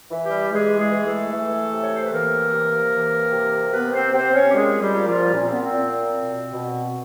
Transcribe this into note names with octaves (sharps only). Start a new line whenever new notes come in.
E3
G3 G4
E3 G#3 G#4
G#3 G#4
E3
A3 A4
E3
C3
C#5
C5
B4
E3 A#3 A#4
C3
E3
C3
C3 B3 B4
C4 C5
C3 C4 C5
C#4 C#5
G4
A#2 G#3 G#4
G3 G4
A#2
F3 F4
A#2 C#4
C4
B3
C4
A#2
B2
B2